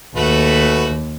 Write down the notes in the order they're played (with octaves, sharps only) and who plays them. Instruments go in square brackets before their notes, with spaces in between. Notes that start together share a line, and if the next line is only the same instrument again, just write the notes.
[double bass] D#2 [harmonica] A3 F#4 B4